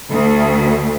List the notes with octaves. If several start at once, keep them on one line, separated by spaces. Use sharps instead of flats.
D2